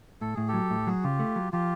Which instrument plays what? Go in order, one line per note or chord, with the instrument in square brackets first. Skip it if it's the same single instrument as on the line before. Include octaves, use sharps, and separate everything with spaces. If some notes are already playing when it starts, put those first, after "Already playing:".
[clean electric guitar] A2 [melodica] A4
[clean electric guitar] A2 [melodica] G#4
[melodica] G4 A4
[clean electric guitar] F#3
A2
[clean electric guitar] F#3 [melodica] F#4 G#4
[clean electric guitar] C#3 [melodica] F4 G4
[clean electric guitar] A3
F#3
[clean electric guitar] F3 [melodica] F4 G4